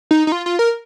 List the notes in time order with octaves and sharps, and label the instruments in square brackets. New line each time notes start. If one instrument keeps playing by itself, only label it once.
[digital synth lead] D#4
D#4
F4
F4
A#4